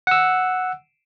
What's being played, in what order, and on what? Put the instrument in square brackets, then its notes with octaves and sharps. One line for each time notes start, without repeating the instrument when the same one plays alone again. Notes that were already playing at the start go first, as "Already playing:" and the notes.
[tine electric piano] F#5 E6